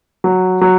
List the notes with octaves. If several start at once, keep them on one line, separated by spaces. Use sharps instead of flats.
F#3
F#3